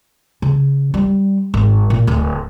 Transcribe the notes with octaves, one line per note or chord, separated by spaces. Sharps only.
C#3
G3
G#1
A#2
D1